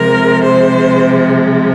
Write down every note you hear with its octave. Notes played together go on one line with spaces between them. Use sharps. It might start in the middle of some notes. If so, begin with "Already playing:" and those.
Already playing: C3 F3 G#3 A#4
C5